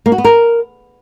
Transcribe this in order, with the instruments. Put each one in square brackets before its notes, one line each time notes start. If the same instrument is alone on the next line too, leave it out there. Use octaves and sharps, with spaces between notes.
[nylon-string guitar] A#3
F#4
B3
A#4